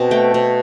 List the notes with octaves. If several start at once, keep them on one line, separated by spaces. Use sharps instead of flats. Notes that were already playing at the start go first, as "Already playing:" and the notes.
Already playing: B2 C4 A5
A3 G5
B2